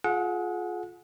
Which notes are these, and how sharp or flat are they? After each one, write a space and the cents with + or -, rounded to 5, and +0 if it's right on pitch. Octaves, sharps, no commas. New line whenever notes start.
F4 +10 G#4 +30 F#5 -25